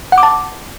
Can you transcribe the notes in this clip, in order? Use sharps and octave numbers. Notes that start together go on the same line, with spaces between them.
F#5
D6
A5